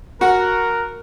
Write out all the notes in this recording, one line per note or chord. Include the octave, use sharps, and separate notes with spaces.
F#4 A#4 F#5